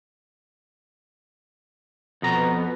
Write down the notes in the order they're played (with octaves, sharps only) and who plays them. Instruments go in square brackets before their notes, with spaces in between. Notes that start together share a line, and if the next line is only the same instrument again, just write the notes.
[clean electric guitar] F2 A#5 [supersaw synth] B2 B3